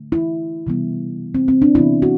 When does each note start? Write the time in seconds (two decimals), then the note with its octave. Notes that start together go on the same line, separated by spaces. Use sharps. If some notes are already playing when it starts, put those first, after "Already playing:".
Already playing: D3 A3
0.12 E4
0.67 C3 E3 G3 B3
1.35 C4
1.48 C4
1.62 D4
1.75 C3 E3 B3 E4
2.02 F#4